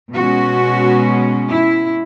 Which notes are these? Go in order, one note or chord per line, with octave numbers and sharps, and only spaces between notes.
B2 G#3 C#4 F#4
E4